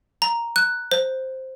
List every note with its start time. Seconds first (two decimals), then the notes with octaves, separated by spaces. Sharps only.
0.22 A#5
0.56 F#6
0.92 C5